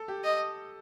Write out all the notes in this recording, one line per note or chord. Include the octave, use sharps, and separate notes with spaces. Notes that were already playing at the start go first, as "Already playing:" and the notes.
Already playing: A4
G4
D#5